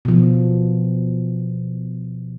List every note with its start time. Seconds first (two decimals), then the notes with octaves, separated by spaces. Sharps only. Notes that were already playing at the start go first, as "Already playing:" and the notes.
0.05 B2 F3